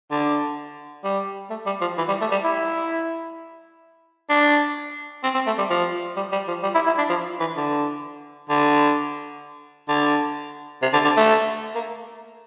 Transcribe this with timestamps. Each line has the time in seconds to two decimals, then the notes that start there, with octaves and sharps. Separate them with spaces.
0.11 D3
1.04 G3
1.50 A3
1.66 G3
1.81 F3
1.98 E3
2.09 G3
2.21 A3
2.32 G3
2.44 E4
4.30 D4
5.24 C4
5.34 C4
5.47 A3
5.58 G3
5.70 F3
6.16 G3
6.32 G3
6.48 F3
6.63 G3
6.75 E4
6.87 E4
6.98 D4
7.09 F3
7.40 E3
7.57 D3
8.50 D3
9.88 D3
10.82 C3
10.93 D3
11.05 D3
11.17 A3
11.75 A#3